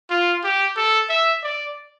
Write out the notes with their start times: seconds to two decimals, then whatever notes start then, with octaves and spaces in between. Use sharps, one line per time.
0.10 F4
0.44 G4
0.77 A4
1.09 E5
1.43 D5